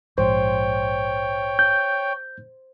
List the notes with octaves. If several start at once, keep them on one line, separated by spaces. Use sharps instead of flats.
A#1 G#2 F3 C5 C#5 G5
G6